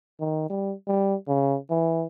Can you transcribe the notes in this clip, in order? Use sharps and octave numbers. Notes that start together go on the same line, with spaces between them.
D#3
G3
G3
C#3
E3